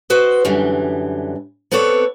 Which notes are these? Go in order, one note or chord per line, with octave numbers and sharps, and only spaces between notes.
F#4 B4 C5 D#5
F#2 D3 E3 G3
B3 C4 A4 B4 C#5 D5